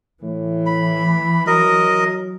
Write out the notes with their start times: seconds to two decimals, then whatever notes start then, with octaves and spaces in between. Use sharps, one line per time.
0.23 A2 E3
0.66 B5
1.47 F#3 A#4 D#5